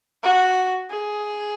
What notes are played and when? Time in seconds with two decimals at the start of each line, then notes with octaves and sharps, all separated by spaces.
0.23 F#4
0.90 G#4